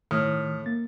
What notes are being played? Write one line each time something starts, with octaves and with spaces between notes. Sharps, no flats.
A2 D#3 D#6 F6
A#3 A6